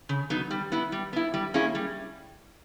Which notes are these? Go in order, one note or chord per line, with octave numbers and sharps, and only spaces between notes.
C#3
F#3 B3 D#4
G3
B3 E4
G3
B3 E4
G3
A#3 C#4 E4 G#4
G3